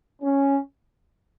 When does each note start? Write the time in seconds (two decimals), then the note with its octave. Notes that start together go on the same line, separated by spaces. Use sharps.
0.22 C#4